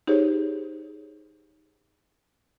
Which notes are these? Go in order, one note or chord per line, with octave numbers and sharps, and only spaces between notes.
D#4 G4 G#4 C5 C#5